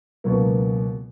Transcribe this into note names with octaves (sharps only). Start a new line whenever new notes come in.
C#2 B2 F#3 A#3